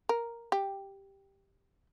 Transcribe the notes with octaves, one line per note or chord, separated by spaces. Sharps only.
A#4
G4